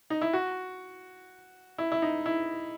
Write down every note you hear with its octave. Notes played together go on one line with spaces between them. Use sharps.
D#4
E4
F#4
E4
E4
D#4
E4